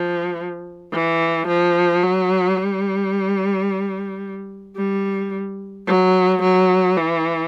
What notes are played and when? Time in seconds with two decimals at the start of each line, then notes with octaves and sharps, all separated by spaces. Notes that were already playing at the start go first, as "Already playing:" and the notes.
Already playing: F3
0.92 E3
1.47 F3
2.03 F#3
2.57 G3
4.77 G3
5.87 F#3
6.42 F#3
6.97 E3